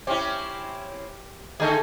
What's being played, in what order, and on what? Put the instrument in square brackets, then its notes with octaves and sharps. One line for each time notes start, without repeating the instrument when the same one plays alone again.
[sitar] C4 C#4 E4 [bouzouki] G4
[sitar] D3 A3 D#4 [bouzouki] G#4 A4 G#5